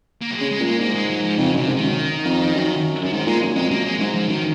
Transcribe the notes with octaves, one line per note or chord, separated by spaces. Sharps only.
A#3
F#3
C#3 G#3
G#3
A#2
G#3
G#2 A#3
G#3
F#3
F3
F2 C#3
F#2
C3
G#2
F#2 D#3
F2
F#2
F#2 F3
G#2 D#3
A#2 G#3
F#2
F2 G#3
F#2 A#3
G#3
G#2 F#3
F3
F#2 D#3